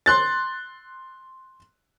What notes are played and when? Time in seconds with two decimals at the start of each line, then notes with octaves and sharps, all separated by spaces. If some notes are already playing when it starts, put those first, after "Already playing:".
0.06 C6 F#6 A6